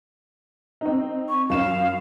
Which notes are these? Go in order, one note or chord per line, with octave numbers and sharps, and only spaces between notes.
C4 D#4
C#6
F#2 C#4 F5 E7